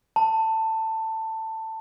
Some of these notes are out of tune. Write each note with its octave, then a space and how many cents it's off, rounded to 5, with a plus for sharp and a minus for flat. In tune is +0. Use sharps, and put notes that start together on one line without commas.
A5 +15